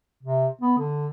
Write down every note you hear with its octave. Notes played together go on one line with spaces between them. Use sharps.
C3
B3
D3